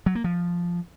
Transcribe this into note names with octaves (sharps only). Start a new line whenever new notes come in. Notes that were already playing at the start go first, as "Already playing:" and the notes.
F#3
A#3
F3